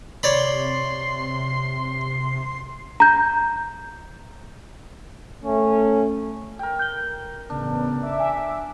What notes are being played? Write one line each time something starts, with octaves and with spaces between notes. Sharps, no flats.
C3 C#5 D5 B5 C6
A#5 G6
A3 C#4
A#4 G5
G6 G7
A1 C#3 B3 D4
E5 D6
G#5